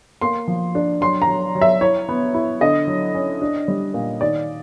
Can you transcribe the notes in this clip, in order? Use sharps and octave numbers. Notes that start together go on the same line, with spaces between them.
A#3 C6
F3
D4
F#3 C6
A#5
F#3
F#3
E5
E4 C#5
B3
E4
D3 D#5
F#3
C#4
D4
G3
A#2
D#3 D5